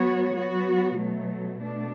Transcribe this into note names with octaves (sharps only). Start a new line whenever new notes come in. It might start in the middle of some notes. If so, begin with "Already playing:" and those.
Already playing: F#3 B3 F#4 C#5
F#3 B3 F#4
B2 F#3 A3
B2 A3 D4